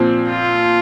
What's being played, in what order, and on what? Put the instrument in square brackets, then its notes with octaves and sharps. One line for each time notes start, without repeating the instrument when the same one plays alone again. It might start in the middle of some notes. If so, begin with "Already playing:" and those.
Already playing: [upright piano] A#2 F3 C4
[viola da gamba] F4